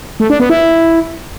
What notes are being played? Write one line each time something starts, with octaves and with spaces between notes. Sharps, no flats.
A3
D4
B3
E4